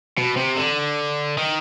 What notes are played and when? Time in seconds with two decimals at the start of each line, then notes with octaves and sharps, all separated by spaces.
0.18 B2
0.37 C3
0.57 D3
1.38 D#3